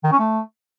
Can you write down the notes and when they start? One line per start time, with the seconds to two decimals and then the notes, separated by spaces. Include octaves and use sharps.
0.04 D#3
0.12 C#4
0.19 A3